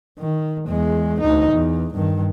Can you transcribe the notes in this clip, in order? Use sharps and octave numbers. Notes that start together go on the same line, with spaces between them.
D#3
E2 G#3
D2 D#4
E2
G2 D#3